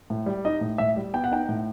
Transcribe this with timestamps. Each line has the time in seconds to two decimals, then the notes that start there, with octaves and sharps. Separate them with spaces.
0.10 A2
0.26 G3
0.45 D#4 D#5
0.61 A2
0.78 A2 E5
0.97 G3
1.13 B3 G5
1.24 F#5
1.32 D#4 G5
1.49 A2